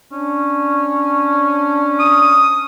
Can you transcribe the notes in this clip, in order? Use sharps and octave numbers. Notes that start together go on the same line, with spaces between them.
C#4 D4
D#6